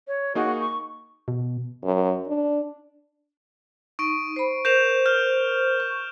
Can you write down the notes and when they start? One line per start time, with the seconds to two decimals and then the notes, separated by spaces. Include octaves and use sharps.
0.08 C#5
0.35 A#3 D#4 F#4 G#4
0.60 C#6
1.28 B2
1.84 F#2
2.28 D4
3.99 D#4 C#6 D7
4.36 C5 B5
4.65 A#4 C5 G6 E7 F7
5.06 F6 G6
5.80 C#6